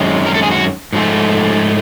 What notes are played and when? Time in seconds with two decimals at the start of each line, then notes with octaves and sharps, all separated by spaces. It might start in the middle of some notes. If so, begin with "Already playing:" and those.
Already playing: F#2 D#3 G#3 C4
0.26 A#4
0.34 A4
0.42 G#4
0.51 F#4
0.93 G#2 F3 A3